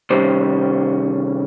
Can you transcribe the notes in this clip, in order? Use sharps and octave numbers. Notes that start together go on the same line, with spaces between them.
C3 D#3 G3 C#4 C5